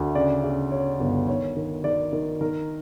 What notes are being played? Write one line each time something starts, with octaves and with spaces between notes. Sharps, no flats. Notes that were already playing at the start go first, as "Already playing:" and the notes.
Already playing: D2
C#3 D5
C#3
C#3 C#5
G1
D#3 C#5
D#3
D#3 D5
D#3
D#3 A#4